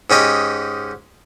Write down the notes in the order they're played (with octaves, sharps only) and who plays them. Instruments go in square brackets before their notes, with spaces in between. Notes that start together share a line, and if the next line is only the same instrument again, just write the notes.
[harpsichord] G#2 C#4 G4 D#5